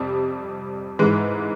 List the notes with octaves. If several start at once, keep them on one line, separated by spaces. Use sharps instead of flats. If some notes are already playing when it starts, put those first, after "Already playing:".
Already playing: F2 C3 G3
G#2 E3 G#3